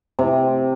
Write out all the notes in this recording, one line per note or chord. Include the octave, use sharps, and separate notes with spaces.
C3